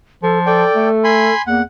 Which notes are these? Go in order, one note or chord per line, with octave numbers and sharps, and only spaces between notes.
F3 A4
A4 D5 G5
A3
G#5 B5 C6
E2 A#3 F#5